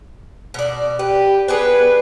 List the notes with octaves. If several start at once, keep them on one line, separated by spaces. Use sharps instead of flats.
B2 D5
G4 B4
B3 D4 G#4 B4